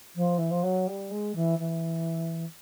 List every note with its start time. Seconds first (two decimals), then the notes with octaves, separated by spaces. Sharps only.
0.15 F3
0.37 E3
0.50 F3
0.63 F#3
0.87 G3
1.10 G#3
1.35 E3
1.58 E3